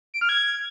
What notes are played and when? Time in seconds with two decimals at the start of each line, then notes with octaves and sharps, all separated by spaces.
0.14 D7
0.21 F6
0.29 G#6